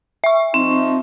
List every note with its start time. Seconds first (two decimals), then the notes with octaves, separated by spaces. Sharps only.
0.24 E5 C#6
0.54 F3 C4 D#4